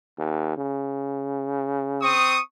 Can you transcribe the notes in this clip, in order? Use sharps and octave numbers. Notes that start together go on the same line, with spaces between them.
D#2
C#3
C4 C#6 D#6